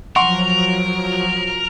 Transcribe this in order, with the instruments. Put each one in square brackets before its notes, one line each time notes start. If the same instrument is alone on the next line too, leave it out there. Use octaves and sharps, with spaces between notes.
[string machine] F3 F#3 [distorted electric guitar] A#4 [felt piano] F#5 C6 C#6